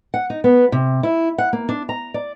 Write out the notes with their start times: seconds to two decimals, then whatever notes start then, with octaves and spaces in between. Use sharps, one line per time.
0.14 F#5
0.30 D#4
0.44 B3
0.72 C3
1.03 E4
1.38 F#5
1.53 A#3
1.69 D4
1.89 A#5
2.14 D5